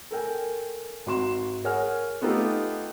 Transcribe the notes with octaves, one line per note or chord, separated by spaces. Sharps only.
A4 A#4 G5 G#5
G#1 F#4 C6 E7
G#4 A#4 C#5 F#5 G#5 F6
A3 B3 D#4 F4 G4 A4